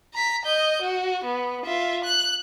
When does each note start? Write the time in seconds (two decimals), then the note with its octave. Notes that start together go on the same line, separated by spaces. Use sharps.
0.14 A#5 B6
0.45 D#5 G6
0.82 F#4
1.24 B3
1.65 F4 E5
2.05 F#6